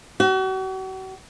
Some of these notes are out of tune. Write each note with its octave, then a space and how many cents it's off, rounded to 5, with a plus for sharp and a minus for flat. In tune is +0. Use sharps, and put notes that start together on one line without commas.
F#4 +40